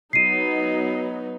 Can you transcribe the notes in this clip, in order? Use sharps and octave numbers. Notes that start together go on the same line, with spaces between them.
F#3 B3 D#4 C7 D#7